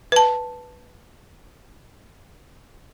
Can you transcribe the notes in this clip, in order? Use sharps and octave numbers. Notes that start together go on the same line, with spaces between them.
B4 A5